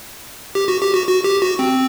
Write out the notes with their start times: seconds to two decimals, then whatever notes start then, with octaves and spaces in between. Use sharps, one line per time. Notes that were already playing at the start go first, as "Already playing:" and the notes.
0.55 G4
0.68 F#4
0.82 G4
0.94 F#4
1.07 F#4
1.24 G4
1.42 F#4
1.59 C4